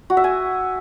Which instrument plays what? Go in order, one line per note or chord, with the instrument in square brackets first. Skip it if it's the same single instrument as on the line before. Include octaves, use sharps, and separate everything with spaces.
[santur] F#4
E5
G#5